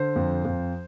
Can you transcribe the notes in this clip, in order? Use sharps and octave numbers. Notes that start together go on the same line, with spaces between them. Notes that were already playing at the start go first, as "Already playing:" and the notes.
Already playing: D3 C5
F2
F2